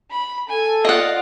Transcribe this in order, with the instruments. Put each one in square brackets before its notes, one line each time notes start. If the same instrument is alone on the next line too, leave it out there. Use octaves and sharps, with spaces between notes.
[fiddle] B5
[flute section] A4 [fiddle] G#5
[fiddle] F4 D5 [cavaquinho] D#5 F#5